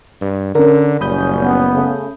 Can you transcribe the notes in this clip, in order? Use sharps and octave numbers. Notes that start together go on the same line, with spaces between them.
G2
D3 C#4 A#4
F#1 A#2 G3 C#4 B5 D#6 G6
B3
C#3 A3